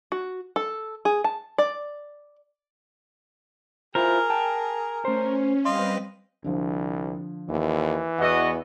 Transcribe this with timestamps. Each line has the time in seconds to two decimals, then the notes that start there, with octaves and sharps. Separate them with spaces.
0.12 F#4
0.56 A4
1.05 G#4
1.24 A5
1.58 D5
3.95 E4 F4 G#4 A#4 C5
4.30 G5 A5
5.05 A3 C#4 C5
5.65 G3 C4 B4 D#5 F5 C6
6.44 C2 D3 F3
7.49 D#2 E3
8.18 E2 B3 F#4 D#5 F#5 E6